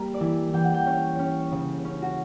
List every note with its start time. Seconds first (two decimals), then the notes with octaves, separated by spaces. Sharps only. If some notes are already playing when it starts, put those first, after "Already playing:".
Already playing: G3 A#3
0.14 D5
0.20 E3 E5
0.53 E3 G5
0.64 F#5
0.74 G5
0.86 C#4
1.19 C#4
1.52 C#3
1.85 C#4
2.02 F#4